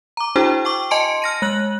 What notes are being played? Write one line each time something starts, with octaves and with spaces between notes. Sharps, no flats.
A#5 D6
D4 E4 F#4 G#4 C5 G5
G5 C#6 D6
D#5 G#5 A5 C6 C#7 D7
F6 A#6 D#7
G#3 F#6 F#7